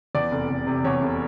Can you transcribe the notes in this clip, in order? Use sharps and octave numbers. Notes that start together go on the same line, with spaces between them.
E2 D5
F1
F1
C3
E2 C#5
F1